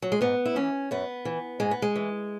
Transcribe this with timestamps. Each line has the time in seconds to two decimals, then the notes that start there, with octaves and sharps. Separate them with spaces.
0.02 F#3
0.12 G#3
0.21 G#2 B3
0.45 E4
0.56 E3 C#4
0.91 F#2 B3
1.25 E3
1.60 G#2 G#3
1.71 B3
1.82 G#3
1.96 E3